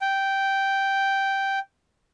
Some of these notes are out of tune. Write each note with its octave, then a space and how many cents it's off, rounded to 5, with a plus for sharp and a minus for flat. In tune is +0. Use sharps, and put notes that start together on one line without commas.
G5 -5